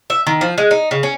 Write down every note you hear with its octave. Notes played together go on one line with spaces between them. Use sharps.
E5
D#3
F3
G#3
D#4
C#3
C#4